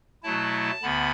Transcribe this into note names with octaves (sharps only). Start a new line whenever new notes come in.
B2 F#3 A3 E4 A5
D2 D3 B3 B5